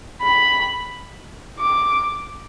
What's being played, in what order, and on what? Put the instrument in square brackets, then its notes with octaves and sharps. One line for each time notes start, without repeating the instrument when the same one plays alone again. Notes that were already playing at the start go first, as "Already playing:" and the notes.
[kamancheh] B5
D6